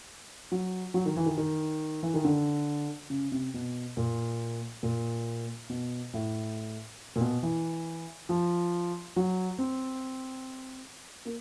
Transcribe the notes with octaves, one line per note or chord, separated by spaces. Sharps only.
F#3
F#3
D#3
E3
D#3
D#3
E3
D#3
D3
C#3
C3
B2
A#2
A#2
B2
A2
A#2
B2
E3
F3
F#3
C4
A#3